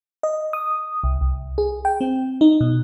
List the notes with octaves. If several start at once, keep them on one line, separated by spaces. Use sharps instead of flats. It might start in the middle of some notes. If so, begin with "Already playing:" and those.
D#5
D#6
C2
C2
G#4
G5
C4
D#4
B2